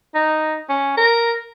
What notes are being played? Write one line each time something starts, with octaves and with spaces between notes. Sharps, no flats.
D#4
C#4
A#4